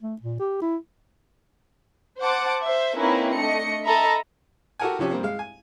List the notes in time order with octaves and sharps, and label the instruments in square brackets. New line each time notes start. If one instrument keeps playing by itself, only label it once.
[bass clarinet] A3
A#2
G4
E4
[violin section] C5 F#5 A5 D6
C5 E5
A#3 C4 C#4 D#4 E4 B4
A3 D4 D#5 C#7
A4 D#5 E5 A#5 B5
[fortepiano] F#4 G4 A4 A#4 F#5 G#5
C3 F3 C#4 G4
G2 A#3 C4
G#3 F5
G#5